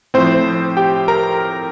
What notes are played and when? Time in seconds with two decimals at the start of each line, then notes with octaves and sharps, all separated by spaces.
0.14 A2 F3 C4 C5
0.77 G4 G5
1.08 A#4 A#5